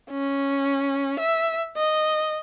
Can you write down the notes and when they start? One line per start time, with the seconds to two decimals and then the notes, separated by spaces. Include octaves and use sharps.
0.10 C#4
1.20 E5
1.77 D#5